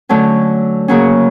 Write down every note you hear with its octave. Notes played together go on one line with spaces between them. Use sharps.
D3 F#3 A3 C#4
C#3 F#3 A#3 C#4